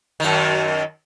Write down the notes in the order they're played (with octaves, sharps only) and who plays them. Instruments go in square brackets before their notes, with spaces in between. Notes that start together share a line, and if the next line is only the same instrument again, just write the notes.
[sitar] F#2 D#3